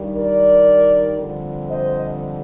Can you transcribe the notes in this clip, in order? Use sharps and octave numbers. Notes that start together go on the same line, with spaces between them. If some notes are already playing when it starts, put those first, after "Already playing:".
Already playing: G2 D#3 G3
A#4 D5
F2 D3 G3
C5 D#5